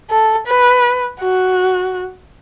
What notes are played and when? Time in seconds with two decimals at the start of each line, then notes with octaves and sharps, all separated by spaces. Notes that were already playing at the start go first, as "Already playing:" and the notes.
0.10 A4
0.47 B4
1.20 F#4